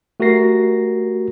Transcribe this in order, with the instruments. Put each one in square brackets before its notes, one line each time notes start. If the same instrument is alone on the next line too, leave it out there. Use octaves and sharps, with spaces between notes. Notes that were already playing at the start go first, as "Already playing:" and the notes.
[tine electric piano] A3 F#4 G4 A#4 A#6 C7